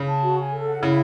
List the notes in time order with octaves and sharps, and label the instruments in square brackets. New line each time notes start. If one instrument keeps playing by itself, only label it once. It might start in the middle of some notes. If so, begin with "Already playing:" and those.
Already playing: [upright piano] C#3
[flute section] A5
F#4
G#5
A4
F#5
[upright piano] C#3 [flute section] E4